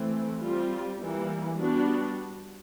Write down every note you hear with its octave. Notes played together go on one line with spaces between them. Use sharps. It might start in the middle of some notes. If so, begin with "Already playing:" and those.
Already playing: E3 A3 C4
G3 C4 F4
E3 G3 A#3
G3 B3 D4 F#4